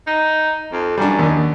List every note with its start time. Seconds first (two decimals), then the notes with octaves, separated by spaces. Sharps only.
0.07 D#4
0.72 F2
0.97 F#2 G3 D4
1.19 D#2 D4